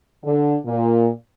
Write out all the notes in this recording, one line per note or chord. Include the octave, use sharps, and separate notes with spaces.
D3
A#2